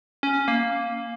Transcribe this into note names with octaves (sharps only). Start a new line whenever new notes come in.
C#4
A#3